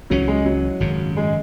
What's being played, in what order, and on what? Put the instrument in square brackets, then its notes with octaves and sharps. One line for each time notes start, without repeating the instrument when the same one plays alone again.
[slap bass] C#2 C#3 E3 C#4 [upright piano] F#3
[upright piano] G#3
F#3
[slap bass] G#1 F#2 C#3
[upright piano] G#3